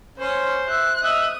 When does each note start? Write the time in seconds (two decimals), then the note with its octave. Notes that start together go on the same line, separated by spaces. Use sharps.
0.18 C#4 C5 C6
0.68 E5 F#6
1.02 D#5 E5 D#6